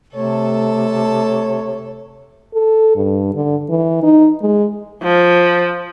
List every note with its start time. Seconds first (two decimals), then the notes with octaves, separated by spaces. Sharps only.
0.15 C3 A3 A4 C#5 A5
2.54 A4
2.96 G2
3.34 D3
3.70 E3
4.03 D#4
4.42 G#3
5.02 F3